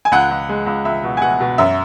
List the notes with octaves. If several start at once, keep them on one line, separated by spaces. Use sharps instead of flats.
G#5
C#2 F#5
C#2
G#3
C#2
C#2 E5
B2
G#5
B2 F#5
B2
F#2 E5